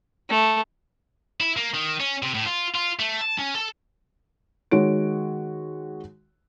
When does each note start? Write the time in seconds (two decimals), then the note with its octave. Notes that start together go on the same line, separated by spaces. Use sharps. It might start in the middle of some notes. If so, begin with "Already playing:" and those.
0.30 A3
1.40 E4
1.56 A#3
1.74 D#3
2.00 C#4
2.22 C3
2.34 A2
2.46 F4
2.75 F4
3.00 A3
3.21 A5
3.39 C#4
3.55 A4
4.71 D#3 G#3 F#4 C#5 D7